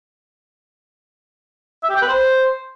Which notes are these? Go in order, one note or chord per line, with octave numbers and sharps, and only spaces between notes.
E5
G4
G5
B4
C5